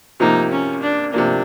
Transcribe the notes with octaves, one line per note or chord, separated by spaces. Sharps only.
C3 F3 A#3 D#4
C#4
D4
C3 F3 A#3 D4